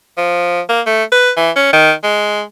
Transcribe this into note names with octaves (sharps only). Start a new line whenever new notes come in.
F3
A#3
A3
B4
E3
C#4
D#3
G#3